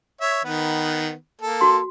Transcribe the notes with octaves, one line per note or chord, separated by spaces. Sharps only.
C#5 E5
D#3 B3 B4
A#3 A4
F#4 C6